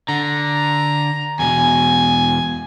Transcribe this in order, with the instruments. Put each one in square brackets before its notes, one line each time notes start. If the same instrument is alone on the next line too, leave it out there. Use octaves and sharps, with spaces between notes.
[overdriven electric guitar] D3 [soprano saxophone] A#5
[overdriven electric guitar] E2 B2 [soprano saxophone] G#5